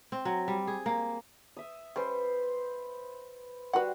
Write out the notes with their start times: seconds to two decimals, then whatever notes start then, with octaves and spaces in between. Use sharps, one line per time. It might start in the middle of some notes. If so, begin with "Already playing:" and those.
0.12 C4
0.25 F#3
0.48 G3
0.67 G#4
0.86 A#3
1.57 E5 D#6
1.96 G3 C#4 B4 C5
3.73 G3 F#4 B4 F#5 C6